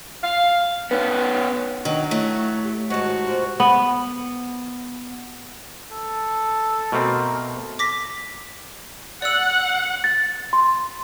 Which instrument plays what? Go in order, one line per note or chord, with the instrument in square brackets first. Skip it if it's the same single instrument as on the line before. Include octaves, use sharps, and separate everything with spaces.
[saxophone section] F5
[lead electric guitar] B3 C#4 [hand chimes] B4
[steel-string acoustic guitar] D#3 [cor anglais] F#3 [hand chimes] D4 F#5
[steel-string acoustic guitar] A3 [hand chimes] E4 C#5 E5
[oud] G4
[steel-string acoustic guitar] G#2 A5 [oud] D#3 [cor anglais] F#4 [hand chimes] C5
[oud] C3 F3 A#3
[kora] B3
[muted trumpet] A4
[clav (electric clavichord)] B2 A3 C4 [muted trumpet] A#4
[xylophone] D6 A#6 B6
[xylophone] D5 E6 [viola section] F#5
[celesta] A6
C6